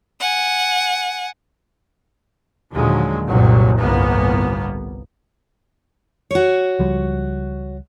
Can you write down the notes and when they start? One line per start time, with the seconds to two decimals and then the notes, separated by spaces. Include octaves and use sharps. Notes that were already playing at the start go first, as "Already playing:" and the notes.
0.20 F#5 G#5
2.72 D#2 A#2 D3 F3 F#3 G#3
3.27 F#1 C2 A#2 F#3
3.79 G1 C2 A2 A#3 B3
6.31 F#4 C#5
6.79 C#2 F3 G3